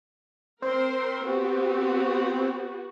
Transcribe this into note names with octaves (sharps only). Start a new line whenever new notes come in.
C4 A#4 C5 C6
B3 F#4 G4